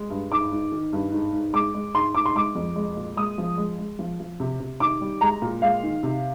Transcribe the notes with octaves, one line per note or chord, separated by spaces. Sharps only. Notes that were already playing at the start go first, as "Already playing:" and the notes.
Already playing: G#3
G2
G#2 D6
G#2
D#3
G2
G#2
G#2
G#3 D6
G#3
G#2 C6
G#2 D6
C6
G#3 D6
F2
G#3
A#2
G#3 D#6
F3
G#3
G#3
F3
F3
C3
C3
D#3 D6
G3
G#3 A#5
A#2
G#3 F5
D#3
C3